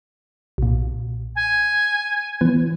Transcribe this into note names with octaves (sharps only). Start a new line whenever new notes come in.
B1 A#2
G#5
E3 B3